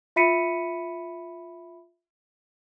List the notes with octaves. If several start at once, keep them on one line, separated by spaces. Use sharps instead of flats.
F4 E5 B5 B6 C#7 D#7